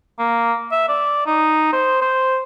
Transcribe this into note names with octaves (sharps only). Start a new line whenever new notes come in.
A#3
E5
D5
D#4
C5
C5